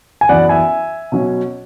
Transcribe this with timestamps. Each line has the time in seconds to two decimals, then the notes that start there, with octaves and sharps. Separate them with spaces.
0.21 G#5
0.29 F#2 E3 B3 D5 F#5
0.49 E5 G#5
1.12 B2 F#3 C#4